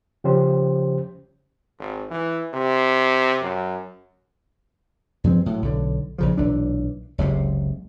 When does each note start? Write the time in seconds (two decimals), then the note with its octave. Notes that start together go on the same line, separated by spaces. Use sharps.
0.24 C#3 F3 C#4 G4 C5
1.79 G#1
2.11 E3
2.54 C3
3.41 F#2
5.24 G2 F3 G#3 C4
5.46 A2 F#3
5.62 B1 D3
6.18 A#1 C#3 F3
6.37 B1 A#2 E3 D4
7.18 F#1 C#2 C3